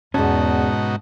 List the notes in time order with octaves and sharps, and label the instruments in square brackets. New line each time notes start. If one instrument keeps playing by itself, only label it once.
[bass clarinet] E2 [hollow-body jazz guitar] G#2 C#4 [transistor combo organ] B2 D#4 F#4 [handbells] A5